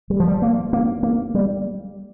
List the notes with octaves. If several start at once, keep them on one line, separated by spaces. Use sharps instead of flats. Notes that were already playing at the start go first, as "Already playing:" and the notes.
G3
F3
G3
A#3
A#3
A#3
G3